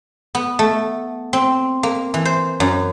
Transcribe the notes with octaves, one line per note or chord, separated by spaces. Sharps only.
B3
A3
C4
A#3
E3
C5
F#2